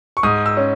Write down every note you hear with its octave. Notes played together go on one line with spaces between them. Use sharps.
C#6
G#2 D#6
E6
C#4